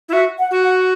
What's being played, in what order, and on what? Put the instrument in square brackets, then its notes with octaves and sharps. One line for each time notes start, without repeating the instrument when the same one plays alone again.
[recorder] E4
[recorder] F#4 [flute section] E5
[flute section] F#5
[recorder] F#4
[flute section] F#5